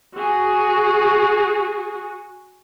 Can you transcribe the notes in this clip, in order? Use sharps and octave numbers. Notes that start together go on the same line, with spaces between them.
F#4 G#4